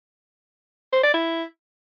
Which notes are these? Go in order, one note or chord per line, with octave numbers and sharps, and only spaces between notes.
C5
D5
E4